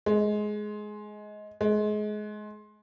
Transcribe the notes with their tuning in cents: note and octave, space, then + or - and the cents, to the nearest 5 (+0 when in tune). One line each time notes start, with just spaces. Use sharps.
G#3 +15
G#3 +25